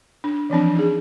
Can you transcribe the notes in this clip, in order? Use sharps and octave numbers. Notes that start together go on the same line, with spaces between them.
D4
E3 F3 C4 D4
D#4 G#4